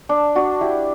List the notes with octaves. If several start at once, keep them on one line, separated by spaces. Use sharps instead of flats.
D4
D4 F#4
E4 G4